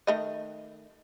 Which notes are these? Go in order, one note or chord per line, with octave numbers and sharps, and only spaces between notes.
D#3 A3 D#5